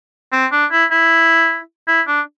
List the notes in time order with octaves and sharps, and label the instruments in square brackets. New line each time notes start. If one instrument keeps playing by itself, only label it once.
[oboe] C4
D4
E4
E4
E4
D4